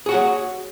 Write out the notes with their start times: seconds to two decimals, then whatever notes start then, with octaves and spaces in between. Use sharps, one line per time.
0.06 G#4
0.09 F#4
0.11 F#5
0.14 C#5